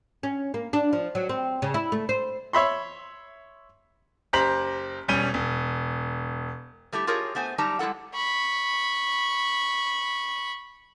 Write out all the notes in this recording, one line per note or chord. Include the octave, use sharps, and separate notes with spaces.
C#4
A#3
D4
F3
F#3
C4
C#3
E4
A3
C5
C#5 E5 B5 C6
F#1 G4 C5 A#5 B6 F#7
E1 G3 C#4 D#7 G7
E1
G3 A3 E4 G4
F4 G4 G#4 A#4 C#5
A3 B3 C5 G#5
F#2 G3 D#4 G4 A5 A#5
G3 G#3 E4 A4 F#5
B5 C#6